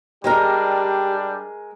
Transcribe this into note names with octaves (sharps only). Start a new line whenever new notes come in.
G3 G#3 D4 G4 G#4 A#4